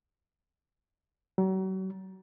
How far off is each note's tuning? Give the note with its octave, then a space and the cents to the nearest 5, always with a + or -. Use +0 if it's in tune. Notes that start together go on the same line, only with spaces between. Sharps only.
F#3 +35